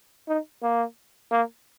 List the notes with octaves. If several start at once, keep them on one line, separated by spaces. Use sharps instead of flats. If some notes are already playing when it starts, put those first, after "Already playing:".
D#4
A#3
A#3